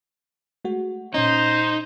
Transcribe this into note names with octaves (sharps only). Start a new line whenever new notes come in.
G#3 A3 F#4
A#2 C#4 D#4 C5